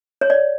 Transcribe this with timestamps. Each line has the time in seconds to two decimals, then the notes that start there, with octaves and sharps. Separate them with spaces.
0.21 C#5
0.30 D5